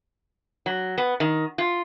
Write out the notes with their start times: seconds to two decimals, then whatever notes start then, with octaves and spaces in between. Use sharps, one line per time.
0.66 F#3
0.98 B3
1.20 D#3
1.58 F4